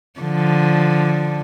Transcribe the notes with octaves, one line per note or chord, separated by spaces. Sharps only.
D3 F3